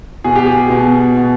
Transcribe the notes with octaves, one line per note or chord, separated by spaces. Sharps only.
B2 G#4
G4
G#4
B2
B2